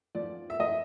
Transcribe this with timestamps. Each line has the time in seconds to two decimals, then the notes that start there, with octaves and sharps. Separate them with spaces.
0.15 F3 D5
0.50 E5
0.59 F3 D#5